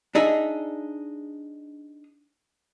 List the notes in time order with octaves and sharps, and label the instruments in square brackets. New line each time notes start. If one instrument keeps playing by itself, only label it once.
[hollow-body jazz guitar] D4 D#4 G#4 E5